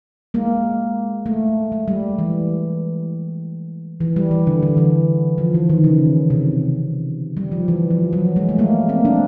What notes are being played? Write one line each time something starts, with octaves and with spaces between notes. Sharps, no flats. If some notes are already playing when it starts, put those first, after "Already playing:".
G#3 A#3
A3
G#3
G3
E3
E3
G3
E3
D3
D3
E3
F3
E3
D#3
C#3
C3
G3
F3
E3
F3
F#3
G#3
A3
G#3 A#3
A#3 C4
C4 D4